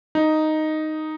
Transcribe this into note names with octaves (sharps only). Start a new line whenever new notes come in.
D#4